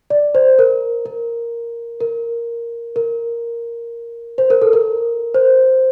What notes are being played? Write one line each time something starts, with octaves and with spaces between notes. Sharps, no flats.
D5
C5
A#4
A#4
A#4
A#4
C5
A#4
A4
A#4
C5